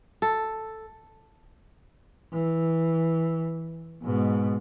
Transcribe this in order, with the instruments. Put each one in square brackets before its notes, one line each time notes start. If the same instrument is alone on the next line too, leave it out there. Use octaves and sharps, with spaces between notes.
[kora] A4
[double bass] E3
G#2 B2